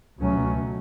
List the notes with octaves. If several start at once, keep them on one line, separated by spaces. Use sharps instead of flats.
C#2 B2 F#3 A3 C#4